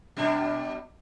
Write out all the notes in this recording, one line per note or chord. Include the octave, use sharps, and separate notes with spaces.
B2 G3 D4